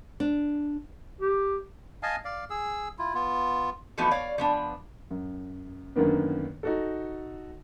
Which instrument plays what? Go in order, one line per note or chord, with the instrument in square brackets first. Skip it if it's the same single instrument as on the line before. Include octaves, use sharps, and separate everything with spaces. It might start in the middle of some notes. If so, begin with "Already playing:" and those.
[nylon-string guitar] D4
[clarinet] G4
[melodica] D#5 F5 G#5 A5
D5 F5
G#4 E6
E4 F4
B3 F4
[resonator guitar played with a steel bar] E3 F3 A3 B3 D#4 F#4
C#5 D5 F5
F3 B3 D4
[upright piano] F#2
F#2 D3 D#3 A#3 B3
D#4 F#4 A4